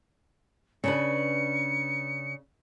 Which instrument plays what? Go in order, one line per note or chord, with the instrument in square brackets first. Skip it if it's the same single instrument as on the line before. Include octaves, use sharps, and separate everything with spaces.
[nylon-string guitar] C#3 D4 B4 [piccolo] C#7